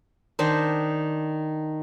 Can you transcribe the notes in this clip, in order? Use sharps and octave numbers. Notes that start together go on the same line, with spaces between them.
D#3 D4 D#4 C5